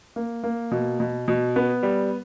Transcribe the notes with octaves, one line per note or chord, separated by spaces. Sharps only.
A#3
A#3
B2
B2
B2
B3
G3